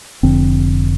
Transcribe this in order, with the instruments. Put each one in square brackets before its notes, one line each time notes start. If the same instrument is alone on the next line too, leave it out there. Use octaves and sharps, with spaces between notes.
[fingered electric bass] F1 F2 D3 C4